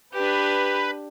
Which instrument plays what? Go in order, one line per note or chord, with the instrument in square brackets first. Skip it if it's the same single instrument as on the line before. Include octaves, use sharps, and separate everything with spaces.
[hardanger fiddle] D4 G4 [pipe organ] B4